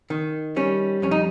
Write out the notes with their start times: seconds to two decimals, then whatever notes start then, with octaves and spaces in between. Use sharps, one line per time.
0.10 D#3
0.56 G3 C#4
1.02 F2 C#4
1.11 D#4